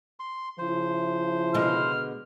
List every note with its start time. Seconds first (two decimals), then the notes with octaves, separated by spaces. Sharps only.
0.20 C6
0.59 C#3 F3 E4 C5
1.54 B2 D3 G#3 F6